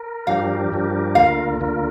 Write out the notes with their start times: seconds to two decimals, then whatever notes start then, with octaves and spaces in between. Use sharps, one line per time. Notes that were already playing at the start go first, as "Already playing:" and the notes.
Already playing: A#4
0.27 G2 F3 D4 G4 A#4 F5
0.72 G2 F3 D4 G4 A#4
1.15 D2 D3 A#3 F4 A#4 F5
1.60 D2 D3 A#3 F4 A#4